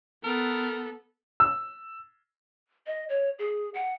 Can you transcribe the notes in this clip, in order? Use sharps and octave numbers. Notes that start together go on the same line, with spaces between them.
B3 A4 A#4
E6
D#5
C#5
G#4
F#5